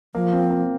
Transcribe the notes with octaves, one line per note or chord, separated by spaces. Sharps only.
F3 A#3
C4
A#3